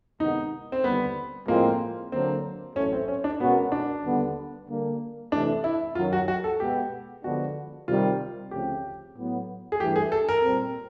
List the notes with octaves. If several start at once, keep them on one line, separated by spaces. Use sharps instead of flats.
C3 D#3 G#3 B3 D#4
C4
D#2 D3 G3 B3
A2 F3 G#3 A#3 C4 F4
D3 F#3 A#3 C4 D4
A1 A2 F#3 A3 C#4
C4
C#4
D4
B2 G#3 B3 C#4 F#4 A#4
D4
D#2 D3 G3 B3
D3 G3 A#3 D4
C3 E3 A3 D4
E4
F#2 D#3 F#3 F4
F#4
F#4
A4
B2 G#3 B3 G4
D3 F3 G#3 B3 D4 F#4
C3 D#3 G3 F4
D2 C#3 F3 A3 C4 G4
A2 F#3 B3
G#4
G2 E3 A3 G4
G#4
A4
A#4
A#2 G3 C4